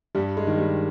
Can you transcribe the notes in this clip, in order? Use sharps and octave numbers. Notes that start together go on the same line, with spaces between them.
G2 G3
G#3
D#3
G3